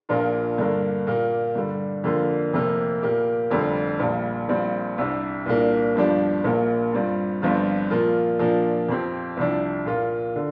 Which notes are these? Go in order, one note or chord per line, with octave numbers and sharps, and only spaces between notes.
A#1 A#2 A#3 D4 F4
G2 D3 A#3 D4
A#2 A#3 G4
G2 D3 G3
F2 D3 A#3 F4
F1 F2 C3 A#3
A#2 A#3 G4
F1 F2 D3 G3
A#1 A#2 G3
A#1 A#2 G3 C4
C2 C3 G3 D4
C2 A#2 A#3 D4
G1 G2 F3 D4 G4
A#1 A#2 A#3
G2 G3 C4 F4
G1 G2 F3 C4 F4
A#2 F3 A#3 F4
A#2 F3 A#3 D4
F2 F3 C4 G4
C2 C3 F3 D4
A#2 A#3 F4
D3